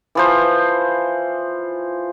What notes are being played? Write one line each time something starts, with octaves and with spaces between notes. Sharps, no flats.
E3 F3 C5